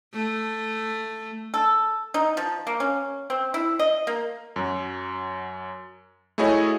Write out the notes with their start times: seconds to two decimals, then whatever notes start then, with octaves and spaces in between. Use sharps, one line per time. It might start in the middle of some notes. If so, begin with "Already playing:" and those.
0.14 A3
1.54 A4
2.14 D#4
2.37 F3
2.67 A#3
2.80 C#4
3.30 C4
3.54 E4
3.79 D#5
4.07 A#3
4.56 F#2 F#3
6.38 A3 E4 F#4 G#4 C#5 D#5